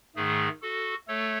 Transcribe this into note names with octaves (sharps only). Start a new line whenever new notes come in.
G#2 D#3 A3 G#4
F#4 A4
A3 A4 C#5